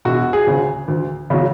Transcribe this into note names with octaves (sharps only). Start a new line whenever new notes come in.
E1 F#4
G#4
D2 C#3
D2
C#3 F#3